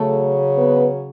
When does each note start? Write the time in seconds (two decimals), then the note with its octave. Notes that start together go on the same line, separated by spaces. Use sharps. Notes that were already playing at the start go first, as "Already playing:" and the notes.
Already playing: C#3 F#3 A3 C#4 A4
0.55 B3 B4